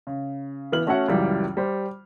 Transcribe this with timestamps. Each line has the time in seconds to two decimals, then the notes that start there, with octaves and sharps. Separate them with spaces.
0.07 C#3
0.72 E3 B3 F6 F#7
0.87 A3 C#4 F#4 C#5 E5 F#5
1.08 C#2 F#2 E3 G3
1.57 G3 C5